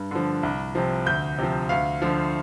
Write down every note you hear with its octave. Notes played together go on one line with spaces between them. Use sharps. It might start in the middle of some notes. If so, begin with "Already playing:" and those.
Already playing: G2
D3 F3
C2
C3 F3
D2 G6
C3 F3
D2 F5
D3 F3